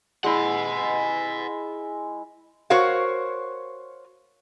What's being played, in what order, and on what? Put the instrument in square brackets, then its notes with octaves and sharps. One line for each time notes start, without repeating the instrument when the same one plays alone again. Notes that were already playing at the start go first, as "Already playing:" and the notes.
[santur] G#3 E4 [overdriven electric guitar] D#5 F#5
[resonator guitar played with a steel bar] F#4 A#4 C5 C#5 F5